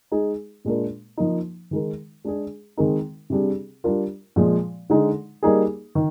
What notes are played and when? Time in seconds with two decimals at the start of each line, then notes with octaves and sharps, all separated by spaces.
0.12 G#3 D#4 G#4
0.65 A#2 G#3 D4 F4 A#4
1.17 F3 A#3 D#4
1.71 D#3 G#3 D#4 A#4
2.24 G#3 D4 G#4
2.77 D#3 G#3 C4 D#4 A#4
3.30 C3 G3 D4 G#4
3.84 G3 D4 F4 A#4
4.36 A#2 F3 G#3
4.90 D3 G#3 D#4
5.43 G3 A#3 D#4 G#4
5.95 D#3